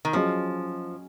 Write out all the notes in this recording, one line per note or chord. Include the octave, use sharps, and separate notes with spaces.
D#3
F3 F#3 C#4 G#4 D#5